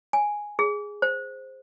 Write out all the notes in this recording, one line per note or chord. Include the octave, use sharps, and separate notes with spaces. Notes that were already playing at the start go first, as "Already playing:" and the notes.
G#5
G#4
C5